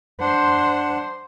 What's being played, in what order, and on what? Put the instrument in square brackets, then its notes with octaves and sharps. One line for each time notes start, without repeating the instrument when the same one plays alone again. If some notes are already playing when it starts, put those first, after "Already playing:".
[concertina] D4 F#5 [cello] C5